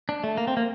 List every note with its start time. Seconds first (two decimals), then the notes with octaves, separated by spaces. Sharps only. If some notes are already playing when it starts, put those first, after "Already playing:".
0.09 D4
0.24 A3
0.38 A#3
0.48 C4
0.57 A#3